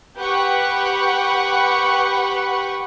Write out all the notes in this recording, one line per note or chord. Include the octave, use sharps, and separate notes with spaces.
G4 B4 F#5 G5 B5 C#6